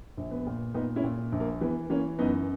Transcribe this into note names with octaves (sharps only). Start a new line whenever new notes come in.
A#1
B3
A#2
A#2 B3 D#4
C#4 E4
A#2
A#1
A#3
E3 B3
E3 A#3 C#4
F#2 B3 D#4